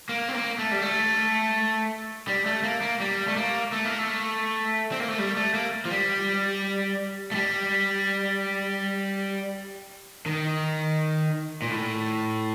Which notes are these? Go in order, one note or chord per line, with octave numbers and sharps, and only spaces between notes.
A#3
C4
A#3
A3
G3
A3
G3
A3
A#3
A#3
G3
A3
A#3
A3
A#3
A3
C4
A#3
A3
G3
A3
A#3
F3
G3
A3
G3
D#3
A#2
A2